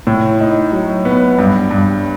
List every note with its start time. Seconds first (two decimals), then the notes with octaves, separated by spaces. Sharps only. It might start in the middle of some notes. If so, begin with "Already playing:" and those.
0.07 A2
0.40 D#4
0.72 F#3
1.05 B3
1.39 G2
1.71 G2